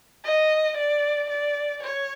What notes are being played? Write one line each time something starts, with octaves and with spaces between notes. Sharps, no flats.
D#5
D5
D5
C#5